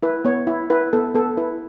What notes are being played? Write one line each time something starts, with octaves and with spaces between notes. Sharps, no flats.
E4 B4
B3 C#5
E4
E4 B4
B3 A4
B3 A4
E4 B4